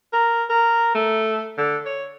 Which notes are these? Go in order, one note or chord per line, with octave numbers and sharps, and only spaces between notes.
A#4
A#4
A3
D3
C#5